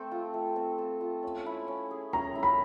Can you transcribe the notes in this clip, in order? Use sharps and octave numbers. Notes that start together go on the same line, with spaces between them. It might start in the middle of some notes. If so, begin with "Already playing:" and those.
Already playing: A3 C4 A4
F4
A3
C4
A4
F4
C#4
E4
C#4
G#4
C#4 A#5
E4
B5